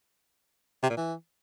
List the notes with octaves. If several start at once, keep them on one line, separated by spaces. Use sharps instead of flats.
C3
A#2
E3